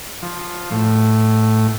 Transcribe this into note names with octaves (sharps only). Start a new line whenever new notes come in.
F3
A2